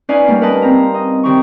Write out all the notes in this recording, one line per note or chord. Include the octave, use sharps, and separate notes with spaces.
C#4 D#4 B4 D5 F5 G#5
G3 A3 A#3 C#4
A#4 B4 D#5 A5
C4 A#5
D#5
C3 D#3 A#5 C#6